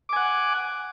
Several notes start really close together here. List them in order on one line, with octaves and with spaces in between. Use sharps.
D6 G#5 F#5